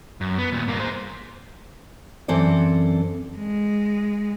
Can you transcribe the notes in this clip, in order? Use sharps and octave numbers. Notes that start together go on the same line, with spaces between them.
F#2
B3
D#2 A#2
G2 A#3
G#4 C5
F#2 E3 C4 A4 D5
G#3